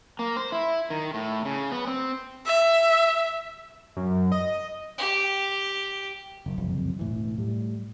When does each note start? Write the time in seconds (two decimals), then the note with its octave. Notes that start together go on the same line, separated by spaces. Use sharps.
0.19 A#3
0.36 C5
0.52 E4
0.90 D#3
1.14 A2
1.45 C#3
1.72 B3
1.87 C4
2.45 E5
3.96 F#2
4.32 D#5
4.98 G4
6.46 F#1
6.58 F#1 C2 F2 C3
6.99 E1 A2 E3
7.38 A2 G3